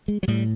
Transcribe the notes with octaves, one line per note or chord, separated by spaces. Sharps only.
G#3
F#3
A2 G3